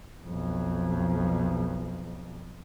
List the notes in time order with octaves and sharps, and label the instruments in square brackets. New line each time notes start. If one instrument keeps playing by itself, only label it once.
[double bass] B1 F2